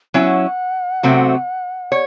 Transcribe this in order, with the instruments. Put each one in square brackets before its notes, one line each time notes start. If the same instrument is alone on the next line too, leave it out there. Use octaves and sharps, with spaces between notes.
[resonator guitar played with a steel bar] F#3 C#4 E4 [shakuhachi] F#5 G#5
[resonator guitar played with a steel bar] C3 F#3 A3 C4 F#4
C#5